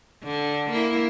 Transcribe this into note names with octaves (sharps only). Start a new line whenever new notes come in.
D3
A#3 E4